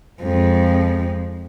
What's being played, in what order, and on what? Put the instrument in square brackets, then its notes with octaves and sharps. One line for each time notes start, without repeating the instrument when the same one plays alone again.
[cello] F2 G#3